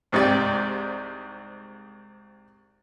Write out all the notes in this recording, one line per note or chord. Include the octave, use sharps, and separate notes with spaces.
C2 G#2 C3 D5